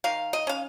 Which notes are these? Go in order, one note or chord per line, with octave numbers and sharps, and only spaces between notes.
D#3 F5
D#5
C#4 F5